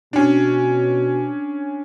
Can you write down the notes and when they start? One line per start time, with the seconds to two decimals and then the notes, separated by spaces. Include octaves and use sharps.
0.13 B2 C#4 D4